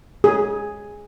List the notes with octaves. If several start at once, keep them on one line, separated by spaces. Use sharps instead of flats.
G#4